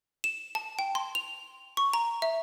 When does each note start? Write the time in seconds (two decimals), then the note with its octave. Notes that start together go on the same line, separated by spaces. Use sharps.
0.24 E7
0.55 A5
0.79 G5
0.95 C6
1.15 F7
1.77 C#6
1.94 A#5
2.22 E5